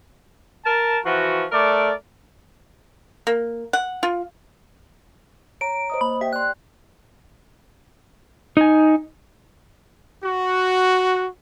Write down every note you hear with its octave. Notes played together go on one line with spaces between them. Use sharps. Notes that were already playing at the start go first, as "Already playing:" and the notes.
A#4 A5
E3 F3 F#4
A3 A#4 D5
A#3
F#5
F4
C#5 A#5 D7
C5 D#5 D#6
A#3 B5
G4 E5 G5
D5 C6 F#6
D#4 G#5
F#4